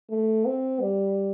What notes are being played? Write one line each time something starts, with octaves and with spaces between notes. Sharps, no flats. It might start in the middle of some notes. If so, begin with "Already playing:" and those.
A3
C4
G3